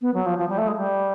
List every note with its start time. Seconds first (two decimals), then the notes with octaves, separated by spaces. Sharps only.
0.01 B3
0.14 F#3
0.26 F3
0.39 F3
0.49 G3
0.58 A3
0.68 G#3
0.76 G3